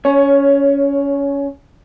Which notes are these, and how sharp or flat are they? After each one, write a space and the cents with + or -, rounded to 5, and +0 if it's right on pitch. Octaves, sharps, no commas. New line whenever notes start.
C#4 +20 C#5 +0